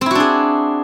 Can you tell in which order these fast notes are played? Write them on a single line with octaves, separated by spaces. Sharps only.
C4 E4 F#4 D4 G#4